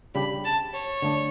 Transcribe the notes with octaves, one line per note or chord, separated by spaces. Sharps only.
C#3 G3 D4 G4 B5
A5
C#5
D3 A3 D4